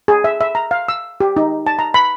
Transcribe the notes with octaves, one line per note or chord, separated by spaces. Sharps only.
G#4
E5
E5
A#5
F5
E6
G4
D#4
A5
A#5
B5